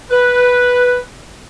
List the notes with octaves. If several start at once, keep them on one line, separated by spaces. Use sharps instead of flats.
B4